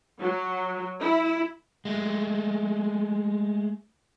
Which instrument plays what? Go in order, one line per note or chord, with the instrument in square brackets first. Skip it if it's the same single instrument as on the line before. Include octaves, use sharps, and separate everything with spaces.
[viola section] F#3
E4
[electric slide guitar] G#3 A3